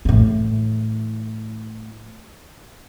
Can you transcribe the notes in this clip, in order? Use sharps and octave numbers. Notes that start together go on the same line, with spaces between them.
A2 E3